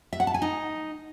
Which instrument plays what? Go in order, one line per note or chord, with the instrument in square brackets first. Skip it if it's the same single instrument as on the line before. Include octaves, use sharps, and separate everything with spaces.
[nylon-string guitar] E5
F#5
A5
G#5
D#4